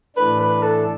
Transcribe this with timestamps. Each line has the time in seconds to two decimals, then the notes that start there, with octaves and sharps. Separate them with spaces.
0.16 A2 E3 A3 D4 B4
0.40 B4
0.63 A4